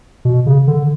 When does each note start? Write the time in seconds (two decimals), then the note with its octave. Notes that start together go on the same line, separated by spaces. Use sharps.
0.25 B2
0.46 C#3
0.68 D3